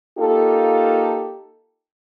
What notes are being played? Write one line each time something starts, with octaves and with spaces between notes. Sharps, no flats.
A#3 D#4 F4 G4 A4